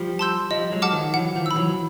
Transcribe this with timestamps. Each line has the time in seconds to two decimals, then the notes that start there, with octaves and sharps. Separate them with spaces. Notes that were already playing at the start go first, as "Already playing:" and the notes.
Already playing: F3 G3
0.19 A5 C6 E6 G6
0.50 F3 G3 D#5
0.72 F#3 G#3
0.82 F#5 A5 D6 F6
0.93 D#3 F3
1.14 E3 F#3 F#5
1.35 D#3 F3
1.46 B5 E6
1.56 E3 F#3